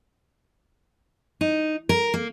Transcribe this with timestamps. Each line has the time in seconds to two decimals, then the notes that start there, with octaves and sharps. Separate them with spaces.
1.41 D#4
1.89 A#4
2.14 A#3